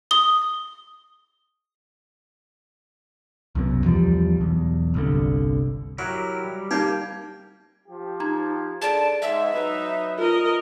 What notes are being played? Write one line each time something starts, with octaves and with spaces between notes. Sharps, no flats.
D#6 G7
C2 F#2 B2
E2 F3 G3
B1 E2
G1 C2 D3
F#3 E4 G4 A#4
G3
A#3 D#4 G4
F3 G4
D#4 A#5 G#6
D3 G#4 D5 A5 D7
G#2 D#5 E5
F#3 D#4 B4
F4 A#4 D#5